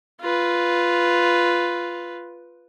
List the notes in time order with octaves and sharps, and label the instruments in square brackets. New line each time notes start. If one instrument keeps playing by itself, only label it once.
[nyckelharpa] F4 B4